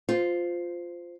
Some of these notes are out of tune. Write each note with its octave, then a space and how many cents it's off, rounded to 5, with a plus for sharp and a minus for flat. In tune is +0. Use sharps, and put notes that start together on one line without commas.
F4 +0 C5 -15